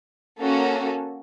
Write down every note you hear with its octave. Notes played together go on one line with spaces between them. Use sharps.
A#3 C#4 F#4 A4